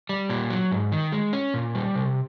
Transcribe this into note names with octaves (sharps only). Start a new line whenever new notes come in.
G3
A#2
F#3
G#2
D#3
G#3
C#4
A#2
G3
C3